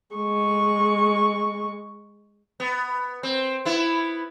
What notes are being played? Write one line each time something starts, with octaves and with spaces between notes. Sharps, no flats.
G#3 C#6
B3
C4
B3 E4